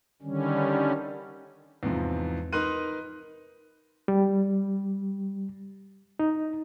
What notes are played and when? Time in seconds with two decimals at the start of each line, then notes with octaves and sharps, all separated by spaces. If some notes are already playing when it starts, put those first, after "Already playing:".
0.22 D3 D#3 G3 C#4
1.83 E2 G#2 C3 F3
2.53 D#4 A#4 B4 C6 F#6 D#7
4.08 G3
6.19 D#4